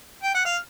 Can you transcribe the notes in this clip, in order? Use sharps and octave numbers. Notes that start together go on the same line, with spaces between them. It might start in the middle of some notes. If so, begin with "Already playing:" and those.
G5
F#5
F5